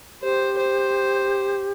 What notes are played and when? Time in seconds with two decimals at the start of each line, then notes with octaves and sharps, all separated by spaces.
0.23 G4 C5
0.58 C5